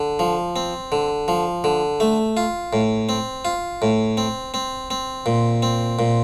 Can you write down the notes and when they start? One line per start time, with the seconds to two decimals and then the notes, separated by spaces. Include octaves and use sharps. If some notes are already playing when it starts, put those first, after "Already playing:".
Already playing: D3
0.19 F3
0.56 C4
0.92 D3
1.28 F3
1.64 D3
2.00 A3
2.37 F4
2.73 A2
3.09 C4
3.45 F4
3.82 A2
4.17 C4
4.54 C4
4.91 C4
5.26 A#2
5.63 C4
5.99 A#2